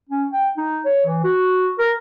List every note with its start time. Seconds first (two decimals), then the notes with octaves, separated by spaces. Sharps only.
0.09 C#4
0.33 G5
0.57 D#4
0.85 C#5
1.06 E3
1.24 F#4
1.79 A#4